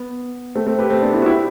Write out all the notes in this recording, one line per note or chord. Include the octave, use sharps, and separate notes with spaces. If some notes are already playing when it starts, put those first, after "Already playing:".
Already playing: B3
A3 C4
A3 C4
G4 B4
A3 C4
B3 D4
C4 E4
F#4
E4 G4